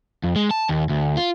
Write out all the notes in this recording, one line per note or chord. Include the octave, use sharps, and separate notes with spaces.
F2
G#3
A5
D#2
D2
F4